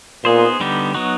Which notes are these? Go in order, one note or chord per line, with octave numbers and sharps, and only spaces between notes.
A#2 B3 D#4 G#4 C5
D3 G3 B3 D#4 G4
F#3 B3 D#4 F#4